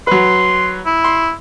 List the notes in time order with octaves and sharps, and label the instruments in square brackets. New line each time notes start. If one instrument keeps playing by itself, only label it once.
[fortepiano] F#3 B4 [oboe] C6
[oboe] E4
[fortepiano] C6